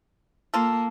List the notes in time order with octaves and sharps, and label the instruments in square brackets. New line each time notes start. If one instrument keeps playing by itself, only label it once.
[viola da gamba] A#3 [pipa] F4 A4